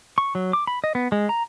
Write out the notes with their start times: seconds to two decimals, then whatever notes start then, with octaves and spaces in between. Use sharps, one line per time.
0.18 C#6
0.35 F#3
0.53 D6
0.67 B5
0.84 D#5
0.95 B3
1.12 G#3
1.29 A#5